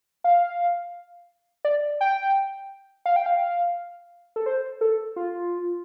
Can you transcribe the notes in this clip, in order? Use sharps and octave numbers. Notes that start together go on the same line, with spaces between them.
F5
D5
G5
F5
G5
F5
A4
C5
A4
F4